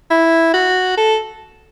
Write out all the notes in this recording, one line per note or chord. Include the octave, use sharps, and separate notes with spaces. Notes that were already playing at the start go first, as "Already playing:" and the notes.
E4
F#4
A4